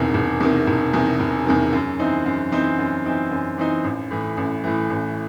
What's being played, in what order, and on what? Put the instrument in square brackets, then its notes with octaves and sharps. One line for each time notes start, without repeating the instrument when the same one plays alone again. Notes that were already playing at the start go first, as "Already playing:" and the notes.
Already playing: [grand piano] E1 E2 C3 D#3
E1
E2 C3 D#3
E1
E2 C3 D#3
E1
E2 C3 D#3
F#2
E3 C4 D#4
F#2
E3 C4 D#4
F#2
E3 C4 D#4
F#2
E3 C4 D#4
A1
A2 E3
A1
A2 E3
A1